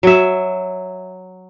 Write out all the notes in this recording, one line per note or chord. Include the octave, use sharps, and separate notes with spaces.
F#3 E5